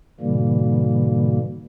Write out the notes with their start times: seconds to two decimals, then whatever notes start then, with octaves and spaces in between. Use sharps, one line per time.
0.20 G#2 B2 D3 E3 G3 A#3